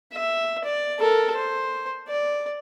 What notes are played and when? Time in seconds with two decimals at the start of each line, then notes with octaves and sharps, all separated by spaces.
0.13 E5
0.64 D5
0.99 A4 A#4
1.36 C5
2.09 D5